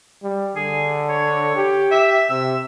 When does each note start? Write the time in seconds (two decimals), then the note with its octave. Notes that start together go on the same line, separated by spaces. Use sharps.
0.23 G3
0.56 D3 G#4
1.09 C#5
1.56 G4
1.91 E5
2.30 C3 E6